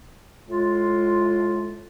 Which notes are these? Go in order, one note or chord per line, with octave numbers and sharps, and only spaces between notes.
A2 G#3 F4